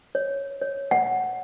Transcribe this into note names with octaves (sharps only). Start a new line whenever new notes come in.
C#5
C#5
F#5